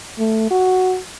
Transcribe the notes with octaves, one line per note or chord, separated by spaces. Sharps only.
A3
F#4